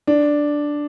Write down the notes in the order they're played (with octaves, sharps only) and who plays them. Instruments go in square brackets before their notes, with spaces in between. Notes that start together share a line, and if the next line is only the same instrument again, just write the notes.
[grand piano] D4